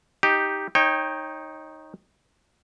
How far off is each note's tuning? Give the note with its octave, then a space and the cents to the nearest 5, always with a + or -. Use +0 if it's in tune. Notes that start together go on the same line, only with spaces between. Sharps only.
D#4 +0 G4 +0
D#4 +0 C#5 -25 G5 +10